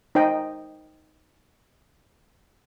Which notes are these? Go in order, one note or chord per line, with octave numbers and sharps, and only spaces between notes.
D#4 C5 D#5 G5